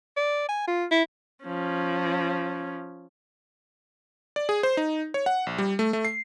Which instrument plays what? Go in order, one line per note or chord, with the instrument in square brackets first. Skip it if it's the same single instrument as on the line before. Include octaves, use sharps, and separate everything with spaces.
[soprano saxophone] D5
G#5
F4
E4
[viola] F3 C#4
[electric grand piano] D5
G#4
C5
D#4
C#5
F#5
A#1
G3
A3
A3
C7